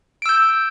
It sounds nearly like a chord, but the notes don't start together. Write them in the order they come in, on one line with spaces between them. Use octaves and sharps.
D7 E6 G6